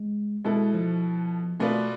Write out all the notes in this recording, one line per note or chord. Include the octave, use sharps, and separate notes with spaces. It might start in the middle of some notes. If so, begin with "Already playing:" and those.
Already playing: G#3
B2 G#3 B3 E4 A4
F3
B2 A3 B3 F4 B4 D5